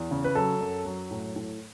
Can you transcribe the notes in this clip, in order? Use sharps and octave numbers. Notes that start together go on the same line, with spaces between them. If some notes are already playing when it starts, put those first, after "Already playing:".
Already playing: E2
C#3
B4
F#3 A4
F#2
F#3
A2
A2